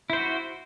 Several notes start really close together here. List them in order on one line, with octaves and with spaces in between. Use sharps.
E4 C5 F#4